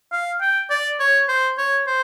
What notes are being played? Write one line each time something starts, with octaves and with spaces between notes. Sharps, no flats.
F5
G5
D5
C#5
C5
C#5
C5